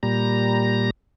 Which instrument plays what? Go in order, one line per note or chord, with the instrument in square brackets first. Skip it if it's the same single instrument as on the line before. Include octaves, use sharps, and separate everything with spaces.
[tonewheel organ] A#2 G3 A#5